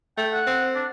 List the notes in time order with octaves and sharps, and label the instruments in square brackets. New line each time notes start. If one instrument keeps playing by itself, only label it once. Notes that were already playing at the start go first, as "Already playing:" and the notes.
[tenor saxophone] A3 [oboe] G5
[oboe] F#5
[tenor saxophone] C4
[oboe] D4